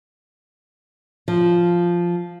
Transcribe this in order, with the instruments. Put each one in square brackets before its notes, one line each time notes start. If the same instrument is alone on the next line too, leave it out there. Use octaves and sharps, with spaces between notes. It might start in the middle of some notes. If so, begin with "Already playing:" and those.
[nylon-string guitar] F3